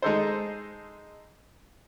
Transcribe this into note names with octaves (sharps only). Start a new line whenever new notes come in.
G#3 D#4 A4 C5